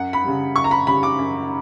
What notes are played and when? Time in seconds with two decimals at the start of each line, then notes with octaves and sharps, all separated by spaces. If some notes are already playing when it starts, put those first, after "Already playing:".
Already playing: F#2 F#5
0.13 B5
0.24 C#3 G3
0.56 F#2 C#6
0.64 A#5
0.71 B5
0.87 C#3 G3 B5
1.03 D6
1.19 F#2